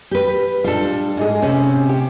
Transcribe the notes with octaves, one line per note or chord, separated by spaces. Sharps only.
G4 B4
G3 D4 F4 A4
G#2 G#4
C3 C4 C#4
G4